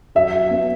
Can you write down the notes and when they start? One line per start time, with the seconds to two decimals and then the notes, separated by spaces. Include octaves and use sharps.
0.15 F#3 E5
0.34 F#3
0.51 B3